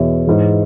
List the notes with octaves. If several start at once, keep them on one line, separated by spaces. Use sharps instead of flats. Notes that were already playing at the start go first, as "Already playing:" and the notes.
Already playing: E2 B2 C#5 E5
G#2 E3